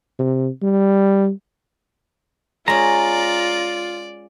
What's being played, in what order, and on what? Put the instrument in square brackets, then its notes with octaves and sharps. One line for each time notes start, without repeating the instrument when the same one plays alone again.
[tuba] C3
G3
[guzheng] G#3 C#4 [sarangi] F4 [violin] D5 [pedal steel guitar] A#5